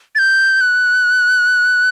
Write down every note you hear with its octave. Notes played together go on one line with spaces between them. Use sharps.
A6
G6
F#6